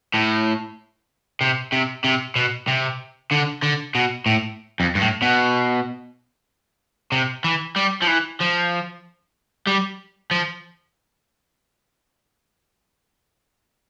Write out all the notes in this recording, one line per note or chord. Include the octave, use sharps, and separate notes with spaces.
A2
C3
C3
C3
B2
C3
D3
D3
B2
A2
F2
G2
A2
B2
C3
E3
G3
F3
E3
F3
G3
F3